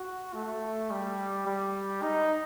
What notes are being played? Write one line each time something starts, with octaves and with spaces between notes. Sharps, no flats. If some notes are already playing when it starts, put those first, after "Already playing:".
Already playing: F#4
A3
G3
G3
D#4